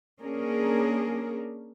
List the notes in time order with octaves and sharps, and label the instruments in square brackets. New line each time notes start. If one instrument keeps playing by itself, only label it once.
[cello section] A#3 C#4 D4 G#4 A#4